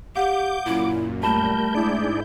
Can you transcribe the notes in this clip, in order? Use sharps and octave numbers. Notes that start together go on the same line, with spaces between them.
G4 F5 F#5 D6 G6
F#2 A#2 E4
G3 A3 A#4 A5 B5 G6 E7
G#2 D4 E4 G#4 D5 G6